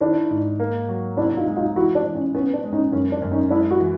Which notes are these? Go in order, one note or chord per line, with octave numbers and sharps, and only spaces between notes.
D#3 D4 E4
G#2
A#3
F#3
C3 D4 E4
D#4 F4
G#3
D#4 F4
E3 E4 F#4
D4
E3
C#4
B3 C#4
D4
G#3
C#4 D#4
F#2 C#4
D4
F#2
C#4 D#4
G#3 D4 E4
E4 F#4
E3